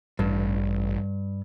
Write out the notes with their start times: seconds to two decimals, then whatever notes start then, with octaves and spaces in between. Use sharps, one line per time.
0.19 A1 G2